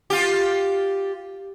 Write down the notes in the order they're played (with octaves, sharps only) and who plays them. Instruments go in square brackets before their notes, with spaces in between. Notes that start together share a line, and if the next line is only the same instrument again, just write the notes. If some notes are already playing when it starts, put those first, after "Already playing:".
[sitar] F4 G4